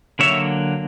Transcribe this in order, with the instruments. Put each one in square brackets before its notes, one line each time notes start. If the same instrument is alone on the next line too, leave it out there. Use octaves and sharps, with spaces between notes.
[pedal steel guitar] D3 F#3 A#3 C#5 E5